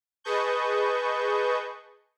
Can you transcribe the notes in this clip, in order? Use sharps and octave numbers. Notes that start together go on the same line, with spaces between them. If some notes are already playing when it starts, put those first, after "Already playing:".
G#4 B4 D#5 A5 C#6 G6